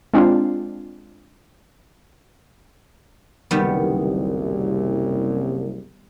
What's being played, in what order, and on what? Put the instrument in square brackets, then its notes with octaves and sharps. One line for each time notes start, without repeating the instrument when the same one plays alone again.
[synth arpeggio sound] G#3 C4 D4 F4
[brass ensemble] F#1 C2 [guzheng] D#3 G3 B3